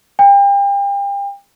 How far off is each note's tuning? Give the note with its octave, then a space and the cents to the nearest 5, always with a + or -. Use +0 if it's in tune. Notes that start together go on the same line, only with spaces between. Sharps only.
G5 +35